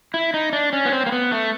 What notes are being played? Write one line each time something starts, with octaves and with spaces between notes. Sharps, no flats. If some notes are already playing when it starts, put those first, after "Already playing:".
E4
D#4
D4
C#4
B3
C4
A#3
B3
A3